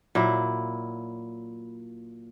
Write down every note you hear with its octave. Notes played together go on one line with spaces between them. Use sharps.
A#2 F#3 E4